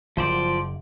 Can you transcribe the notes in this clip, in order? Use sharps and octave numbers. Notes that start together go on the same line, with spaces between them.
F#1 F3 C5 D5